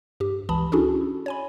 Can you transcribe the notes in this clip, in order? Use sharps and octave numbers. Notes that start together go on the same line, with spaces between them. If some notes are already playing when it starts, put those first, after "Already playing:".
G2 G4
C#2 E3 A5 B5 D#6
C#4 D4 E4 F#4 G#4 A4
C#5 G#5 B5